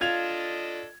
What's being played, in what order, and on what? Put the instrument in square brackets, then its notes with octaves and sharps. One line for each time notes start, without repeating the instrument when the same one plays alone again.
[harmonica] D4 A4 D#5 [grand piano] F4 G#6 F7